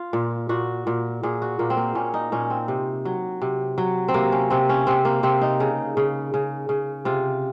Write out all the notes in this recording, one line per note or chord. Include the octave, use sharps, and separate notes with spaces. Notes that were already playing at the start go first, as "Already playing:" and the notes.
Already playing: F4
A#2
A#2 F#4
A#2
A#2 G#4
F#4
A#2 A#3
C4
A#3
A#2 C#4
D#4
A#2 C#4
C4
C3
F#3
C3
F#3
C4
C3 A#3
C#4
C3 C4
C#4
C3 C4
A#3
C3 C4
D#4
C#3
C#3
C#3
C#3
C3 F4